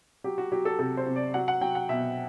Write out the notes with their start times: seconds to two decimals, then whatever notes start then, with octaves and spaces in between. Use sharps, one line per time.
0.24 F#3 G4
0.38 F#4
0.52 F#3 G4
0.65 A4
0.79 C3 A4
0.97 C5
1.06 C3
1.16 D5
1.34 F#3 F#5
1.48 F#5
1.61 F#3 G5
1.75 F#5
1.89 B2 E5